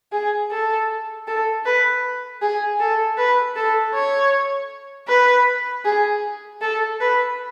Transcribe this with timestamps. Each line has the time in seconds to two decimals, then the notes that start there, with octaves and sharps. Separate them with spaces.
0.12 G#4
0.51 A4
1.27 A4
1.65 B4
2.42 G#4
2.80 A4
3.18 B4
3.56 A4
3.94 C#5
5.08 B4
5.85 G#4
6.62 A4
7.01 B4